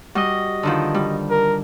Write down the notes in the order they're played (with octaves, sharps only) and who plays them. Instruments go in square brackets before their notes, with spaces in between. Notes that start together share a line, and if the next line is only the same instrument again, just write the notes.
[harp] G3 [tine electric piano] F#4 D#5
[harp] D3 D#3 F3
G3
[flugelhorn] A#4